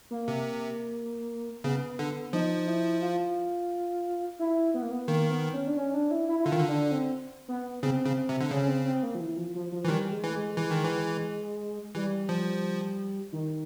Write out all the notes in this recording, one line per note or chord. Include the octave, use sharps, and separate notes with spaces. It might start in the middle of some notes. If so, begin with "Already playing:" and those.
A#3
C3
C#3 B3
D3
F3 D#4
E4
F4
E4
B3
A#3
B3
D#3 A#3
B3
C#4
D4
C#4
D4
E4
E4
E4
D3 F4
D#3
D3
D4
C4
B3
C#3 C4
C#3
C3
D3
C#3 C#4
C4
C4
A#3
F3
E3
F3
F3
F3
E3
D#3 G3
G#3
E3
A3
G#3
E3
D#3
E3
E3 G3
F3
D#3